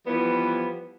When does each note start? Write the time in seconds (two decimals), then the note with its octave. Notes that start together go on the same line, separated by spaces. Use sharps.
0.07 E3 F3 G3 B3